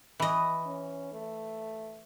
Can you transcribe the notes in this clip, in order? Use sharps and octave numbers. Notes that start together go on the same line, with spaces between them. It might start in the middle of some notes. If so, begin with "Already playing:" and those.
E3 D#5
C#4
A3